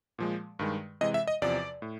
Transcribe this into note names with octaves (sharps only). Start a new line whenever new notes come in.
A#2 F3 G#3
G2 D#3 G#3
C3 E3 G#3 D#5
E5
D#5
E2 C3 F3 D5
A2